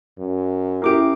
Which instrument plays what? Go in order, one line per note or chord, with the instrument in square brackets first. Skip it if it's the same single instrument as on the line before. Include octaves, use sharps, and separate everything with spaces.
[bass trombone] F#2
[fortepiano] A#3 G4 [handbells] C#4 D6 D7 [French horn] E4